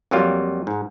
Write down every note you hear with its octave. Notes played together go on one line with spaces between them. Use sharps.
F2 F#3 G3 A#3 F4
G#2